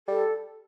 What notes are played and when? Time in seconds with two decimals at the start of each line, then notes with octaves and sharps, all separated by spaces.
0.08 G3 A4